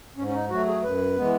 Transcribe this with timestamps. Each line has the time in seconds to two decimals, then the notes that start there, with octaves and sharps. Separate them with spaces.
0.17 G#2 C#4
0.27 C#4
0.34 D#4
0.50 F#3 A3 F#4
0.67 G#4
0.83 F#2 B4
1.16 E3 G#3 B3